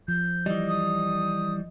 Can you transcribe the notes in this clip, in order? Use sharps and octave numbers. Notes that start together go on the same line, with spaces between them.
F3 G6
E3 G3 D#5
D#6